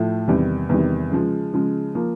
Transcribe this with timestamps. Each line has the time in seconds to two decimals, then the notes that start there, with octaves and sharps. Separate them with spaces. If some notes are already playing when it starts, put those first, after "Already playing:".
Already playing: A2 F3 A3
0.28 E2 C3 D#3 G3
0.69 E2 C3 D#3 G3
1.11 C#3 F3 G#3
1.53 C#3 F3 G#3
1.95 F3 A#3